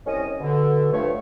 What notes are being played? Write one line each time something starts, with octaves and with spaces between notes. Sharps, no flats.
C2 C#4 D#5
B2 D3
G2 F3 A3 C#5